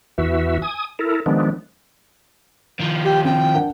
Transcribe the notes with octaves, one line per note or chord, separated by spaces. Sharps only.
E2 E3 F#4 E5
G#5 D#6
E4 A4 A#4
D#3 F3 G#3 B3 D4
D#3 F3
G4
C4 G5
D4 A#4 F#5